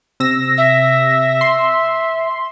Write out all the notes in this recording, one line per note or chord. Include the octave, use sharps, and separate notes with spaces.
C3 E6 A#6
E5
C6